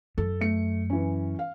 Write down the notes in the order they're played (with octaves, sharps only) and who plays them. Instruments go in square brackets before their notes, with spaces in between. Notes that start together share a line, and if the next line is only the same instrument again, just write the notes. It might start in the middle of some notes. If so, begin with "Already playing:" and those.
[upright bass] F#2 [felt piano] A4
[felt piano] A3 C#7
E3 C#4
F5